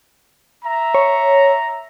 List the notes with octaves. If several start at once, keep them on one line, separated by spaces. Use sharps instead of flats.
E5 A#5
C#5